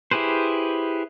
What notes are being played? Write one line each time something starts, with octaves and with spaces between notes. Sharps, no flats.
E4 G4 G#4 B4 C5